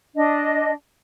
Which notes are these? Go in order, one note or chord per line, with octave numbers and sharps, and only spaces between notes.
D4 D#5